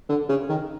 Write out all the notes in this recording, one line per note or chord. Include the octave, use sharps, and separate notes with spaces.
D3
C#3
D#3